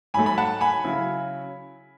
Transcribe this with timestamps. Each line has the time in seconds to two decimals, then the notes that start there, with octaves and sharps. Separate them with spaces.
0.14 G#2 F#3 A3 G#5 B5
0.26 B5
0.38 F#5 A5
0.61 G#5 B5
0.84 C#3 F#3 C#4 E4